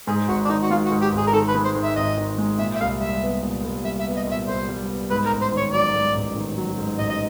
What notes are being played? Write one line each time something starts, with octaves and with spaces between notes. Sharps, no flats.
G#2 G#4
G#1 F#4
D4
D#3 D#4
F#4
G#3 F4
F#4
G#2
G4
G#1
G#4
A#4
D#3 A4
B4
G#3
C5
G#2
E5
G#1 D#5
D#3
G#3
A#2 E5
E5
C2 F5
G3 E5
B3
A#2
C2
G3 E5
E5
B3
D#5
A#2 E5
C2 C5
G3
B3
G#2 B4
A#4
A1
C5
D#3
C#5
F#3 D5
G#2
A1
D#3
F#3
G#2
A1 D#5
D#5